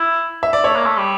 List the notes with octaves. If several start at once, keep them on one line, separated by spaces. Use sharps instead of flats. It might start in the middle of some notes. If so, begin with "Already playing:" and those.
Already playing: E4
E5
D5
A3 C#5
A#3
A3
G3